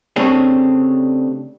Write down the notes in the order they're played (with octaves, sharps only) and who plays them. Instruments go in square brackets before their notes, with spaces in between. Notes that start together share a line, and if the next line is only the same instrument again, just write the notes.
[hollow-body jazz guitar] C#3 A3 C4 D4 G4 G#4